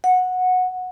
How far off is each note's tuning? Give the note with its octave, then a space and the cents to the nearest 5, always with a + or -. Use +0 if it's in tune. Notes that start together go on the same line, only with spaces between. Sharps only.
F#5 -15